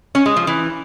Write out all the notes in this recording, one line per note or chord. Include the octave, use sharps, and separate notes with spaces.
C#4
G#3
F3
E3